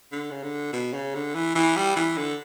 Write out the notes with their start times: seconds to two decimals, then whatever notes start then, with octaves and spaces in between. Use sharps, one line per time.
0.12 D3
0.31 C#3
0.43 D3
0.73 B2
0.94 C#3
1.15 D3
1.35 E3
1.55 E3
1.76 G3
1.96 E3
2.17 D3